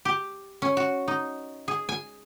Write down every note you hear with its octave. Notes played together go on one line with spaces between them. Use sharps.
G4
C#4
F#4
D#4
G#4
G#5